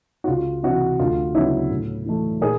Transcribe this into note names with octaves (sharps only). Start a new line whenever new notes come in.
F#4
C#2 F4
C3 E3 E4 F#4
D2 F4
C#3 F#3 B3 E4
A2
E3 A3
A#2 G#4 A#4